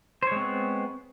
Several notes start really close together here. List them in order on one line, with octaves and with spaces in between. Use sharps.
C5 C#5 G#3 C4 B3